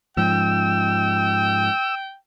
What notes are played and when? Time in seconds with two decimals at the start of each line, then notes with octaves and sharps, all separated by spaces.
0.17 G#2 F3 G5 E6